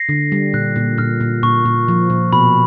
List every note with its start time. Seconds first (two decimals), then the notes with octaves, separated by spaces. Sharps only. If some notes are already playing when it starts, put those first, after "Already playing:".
Already playing: A#6 C7
0.09 D3
0.32 G3
0.53 A#2 F#6
0.76 A#2
0.98 A#2 F6
1.21 A#2
1.43 A#2 C#6
1.65 A#2
1.88 F3
2.10 A#2
2.33 B2 B5